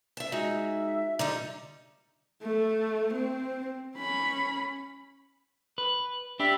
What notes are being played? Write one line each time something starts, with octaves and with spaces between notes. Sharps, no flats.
E5 A5
G#3 D#4 F#4 E5
D3 G3 D#4 A#5
A3
C4
C#4 B5
B4
D4 G4 E5 B5